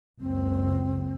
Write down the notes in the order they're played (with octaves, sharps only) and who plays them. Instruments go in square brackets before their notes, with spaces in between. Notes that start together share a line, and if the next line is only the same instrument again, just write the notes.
[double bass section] F#1 C#2 [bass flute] C4